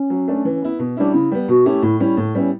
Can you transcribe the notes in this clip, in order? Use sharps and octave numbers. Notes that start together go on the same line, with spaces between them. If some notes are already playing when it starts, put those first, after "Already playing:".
Already playing: C#4
F#3
A3 D4
E3
B3 E4
B2
G3 C#4 D4 E4
C#3 E4
G3 B3
B2 F#4
A3 C#4 E4 G4
A2 E4
G3 C#4 E4
A2
G3 B3 C#4 E4